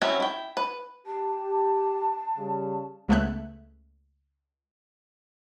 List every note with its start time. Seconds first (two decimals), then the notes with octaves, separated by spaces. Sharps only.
0.02 F#3 C4 C#4 E4
0.20 E4 G5
0.57 B4
1.06 G4 A5
2.36 C#3 G3
3.08 C#2 G#3 A3 B3 E5 F#6